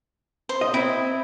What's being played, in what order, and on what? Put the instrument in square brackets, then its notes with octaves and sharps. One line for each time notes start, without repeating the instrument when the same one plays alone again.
[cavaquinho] C5
[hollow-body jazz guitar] D#5
[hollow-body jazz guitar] C4 [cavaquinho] E4